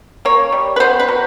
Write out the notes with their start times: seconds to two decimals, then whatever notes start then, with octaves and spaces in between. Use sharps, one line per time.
0.25 A#3 C#5
0.52 G3
0.76 B4
0.80 B3 C5
1.00 B4
1.08 F#3